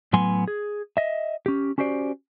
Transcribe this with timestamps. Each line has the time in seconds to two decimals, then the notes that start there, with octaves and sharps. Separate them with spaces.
0.13 A2 F#3 B3 G#5 C6
0.48 G#4
0.97 D#5 E5
1.46 C#4 G4
1.78 C#4 F#4 G4 C5 D5